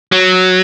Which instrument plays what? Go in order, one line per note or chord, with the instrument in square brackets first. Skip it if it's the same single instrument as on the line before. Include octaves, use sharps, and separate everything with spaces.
[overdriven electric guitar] F#3